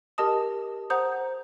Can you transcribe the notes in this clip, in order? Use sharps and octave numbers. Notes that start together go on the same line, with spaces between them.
G4 A#4 D#5 A5 D#6
C5 F#5 A#5 D#6 G6